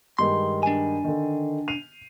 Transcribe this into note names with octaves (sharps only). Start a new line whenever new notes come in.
G2 D#3 G#3 C6
D4 G#5
D3 D#3
C7 D#7 F7